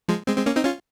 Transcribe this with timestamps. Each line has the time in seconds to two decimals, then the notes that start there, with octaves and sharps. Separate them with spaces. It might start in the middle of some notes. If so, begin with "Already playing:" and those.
0.08 F3 G#3
0.27 G#3 C4
0.37 G#3 C4
0.46 A#3 C#4
0.56 C4 D#4
0.65 C#4 F4